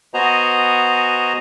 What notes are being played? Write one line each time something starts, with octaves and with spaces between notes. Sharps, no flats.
B3 F#4 C5 D#5 G#5 A#5